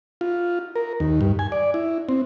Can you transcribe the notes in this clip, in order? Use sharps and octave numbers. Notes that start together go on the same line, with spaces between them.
F4
A#4
D#2
G2
G#5
D5
E4
C4